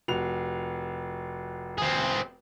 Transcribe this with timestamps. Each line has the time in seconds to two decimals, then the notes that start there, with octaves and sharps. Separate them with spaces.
0.08 F1 F#4 F7
1.78 C4 G#4